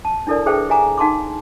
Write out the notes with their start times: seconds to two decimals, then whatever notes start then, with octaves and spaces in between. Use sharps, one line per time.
0.05 A5
0.27 D4 E4 A4 A#4 D5
0.46 G#4 A4 B4 C5 E5 G5
0.69 G4 E5 F#5 G#5 A#5 D6
0.98 D#4 F#5 A5 C6 D6